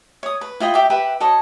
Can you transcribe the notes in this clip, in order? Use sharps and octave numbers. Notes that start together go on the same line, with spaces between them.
C#5 D#6
B4
E4 F4 D#5 G5
G4 E5 G5 D6
G4 B4 E5 F#5
F#4 A4 C#5 D#5